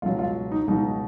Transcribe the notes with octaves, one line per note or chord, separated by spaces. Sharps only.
C#2 B2 F#3 F4
F4
D#4
C#2 B2 F#3 D#4